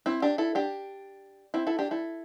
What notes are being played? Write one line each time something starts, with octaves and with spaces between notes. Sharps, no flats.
C4 E4
D4 G4
E4 A4
D4 G4
C4 E4
E4 A4
D4 G4
E4 A4